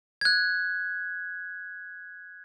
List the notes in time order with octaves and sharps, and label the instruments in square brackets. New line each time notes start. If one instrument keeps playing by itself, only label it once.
[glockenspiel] F#6 G#6